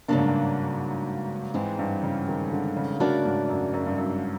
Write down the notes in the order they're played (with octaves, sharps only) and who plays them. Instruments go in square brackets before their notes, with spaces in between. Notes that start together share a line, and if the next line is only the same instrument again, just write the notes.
[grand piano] G2 [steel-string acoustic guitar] C#3 F#3 A#3 D4
[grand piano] G#2
G2
[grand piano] G#2 [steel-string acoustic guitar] E3 G#3 C4
[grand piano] G2
C#3
D#3
D3
C#3
[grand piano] C#3 [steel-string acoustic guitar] A3 D4 F#4 A#4 D5
[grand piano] G#2
F#2
F#2
G2
F#2